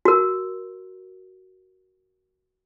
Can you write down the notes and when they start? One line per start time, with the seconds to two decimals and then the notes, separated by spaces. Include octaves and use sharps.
0.05 F#4 A#4